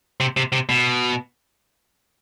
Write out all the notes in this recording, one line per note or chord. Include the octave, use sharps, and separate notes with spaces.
C3
C3
C3
B2